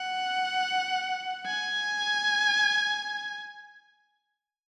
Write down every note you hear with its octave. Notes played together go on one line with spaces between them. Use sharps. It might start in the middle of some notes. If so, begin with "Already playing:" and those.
Already playing: F#5
G#5